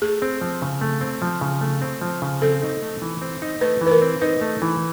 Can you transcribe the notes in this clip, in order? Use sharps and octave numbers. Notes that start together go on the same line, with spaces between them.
A3 G#4
C4
F3
C#3
A3
C4
F3
C#3
A3
C4
F3
C#3
C4 A4
D#4
A3
E3
C4
D#4
A3 B4
E3
B4
A#4
C4
D#4 B4
A3
E3